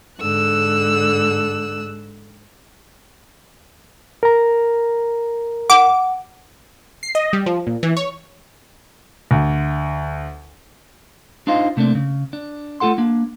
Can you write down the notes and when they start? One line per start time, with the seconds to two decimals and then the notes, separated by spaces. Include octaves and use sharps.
0.20 G#2 D3 E6 F#6
4.23 A#4 A#5
5.70 F#5 D6
7.03 C7
7.15 D#5
7.33 G3
7.46 F3
7.67 A#2
7.83 E3
7.97 C#5
9.31 D2
11.47 D4 D#4 F4 C5 D#5 F5
11.77 C3 A3 A#3 C4 D4
11.95 C#3
12.33 D4
12.80 A3 F4 A4 F#5 C6
12.98 A#3 D4